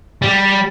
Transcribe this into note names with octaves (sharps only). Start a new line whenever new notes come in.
G3